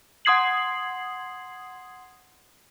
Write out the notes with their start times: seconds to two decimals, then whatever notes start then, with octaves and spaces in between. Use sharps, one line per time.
0.25 F#5 C6 D#6 G#6 C7 F#7